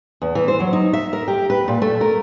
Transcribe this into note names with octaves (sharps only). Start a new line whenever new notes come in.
E2
E3
C5
F#3
D#4
E5
A#4
G4
B4
A#2
A3
A#4